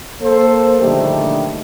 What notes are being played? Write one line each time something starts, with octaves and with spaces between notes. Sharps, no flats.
A#3 A4 C5
A#1 D3 D#3 G3 A3 G4